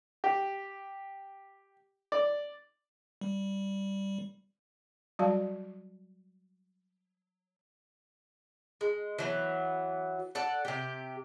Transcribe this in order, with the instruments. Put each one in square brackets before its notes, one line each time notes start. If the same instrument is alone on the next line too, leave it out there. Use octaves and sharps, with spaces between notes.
[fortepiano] G4
D5
[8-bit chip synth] G3
[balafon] F#3 G3 F#4 D5 F5 A5
[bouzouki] G#3
E3 F#3 B3
A4 D5 F#5
C3 G4